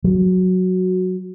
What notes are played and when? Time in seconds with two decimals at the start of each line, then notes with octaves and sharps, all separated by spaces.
0.04 F#3